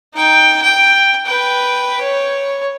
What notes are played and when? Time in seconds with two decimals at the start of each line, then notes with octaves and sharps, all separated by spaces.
0.15 D#4 G5
0.62 G5
1.26 B4 G5
2.01 C#5